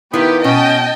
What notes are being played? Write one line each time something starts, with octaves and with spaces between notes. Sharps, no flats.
D#3 B3 E4 F4 G4 B4
B2 C#4 D#5 G5 A5